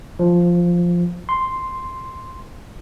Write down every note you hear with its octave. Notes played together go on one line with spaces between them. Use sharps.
F3
C6